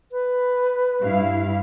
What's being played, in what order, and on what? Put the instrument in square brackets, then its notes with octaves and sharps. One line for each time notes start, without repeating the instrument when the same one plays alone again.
[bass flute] B4
[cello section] G2 E4 F5